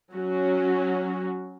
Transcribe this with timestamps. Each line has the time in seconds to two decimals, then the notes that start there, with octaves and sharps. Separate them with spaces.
0.13 F#3 C#4 F#4